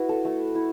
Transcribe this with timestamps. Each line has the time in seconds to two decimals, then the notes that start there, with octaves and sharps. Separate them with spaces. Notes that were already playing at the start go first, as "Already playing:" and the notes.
Already playing: E4 F#4 B4
0.09 A4
0.25 A3
0.55 E4